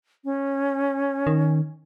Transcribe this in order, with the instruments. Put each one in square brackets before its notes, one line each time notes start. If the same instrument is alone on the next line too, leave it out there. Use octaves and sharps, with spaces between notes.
[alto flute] C#4
[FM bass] D#3